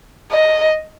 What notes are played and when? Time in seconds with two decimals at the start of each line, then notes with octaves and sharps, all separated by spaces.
0.32 D#5